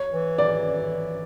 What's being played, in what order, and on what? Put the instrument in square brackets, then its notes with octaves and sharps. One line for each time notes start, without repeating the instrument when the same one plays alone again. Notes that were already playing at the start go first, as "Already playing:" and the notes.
Already playing: [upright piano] C#5
[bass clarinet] E3
[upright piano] D5